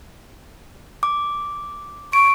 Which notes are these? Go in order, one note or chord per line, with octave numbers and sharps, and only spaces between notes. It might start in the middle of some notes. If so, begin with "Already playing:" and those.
D6
C#6 D7